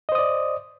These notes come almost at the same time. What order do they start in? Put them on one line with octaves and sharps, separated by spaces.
D#5 C5 D#6 D5